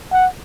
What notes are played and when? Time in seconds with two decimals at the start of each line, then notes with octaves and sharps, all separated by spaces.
0.12 F#5